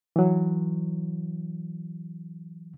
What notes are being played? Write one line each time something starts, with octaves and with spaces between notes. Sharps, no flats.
E3 F#3